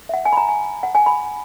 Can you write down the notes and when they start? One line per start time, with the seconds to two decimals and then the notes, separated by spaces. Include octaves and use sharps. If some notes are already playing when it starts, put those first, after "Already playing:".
0.09 E5
0.14 F#5
0.25 G#5
0.33 B5
0.37 A#5
0.49 G#5
0.83 F#5
0.95 G#5
1.06 B5